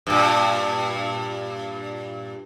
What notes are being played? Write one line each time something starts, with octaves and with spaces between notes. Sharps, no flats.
G2 A#2